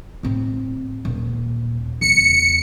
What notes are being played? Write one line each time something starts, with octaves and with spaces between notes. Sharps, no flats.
A2 C4
D#1
E2 C#3 C#7